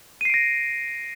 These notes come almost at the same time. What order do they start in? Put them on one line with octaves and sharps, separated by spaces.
D#7 C7 D7 A#6